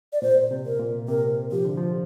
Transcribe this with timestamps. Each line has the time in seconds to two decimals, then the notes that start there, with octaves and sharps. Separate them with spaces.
0.13 D5
0.22 A#2 C5
0.51 C3
0.66 A#4
0.79 A#2
1.08 C3 A#4
1.51 F3 G4
1.65 D3
1.78 F3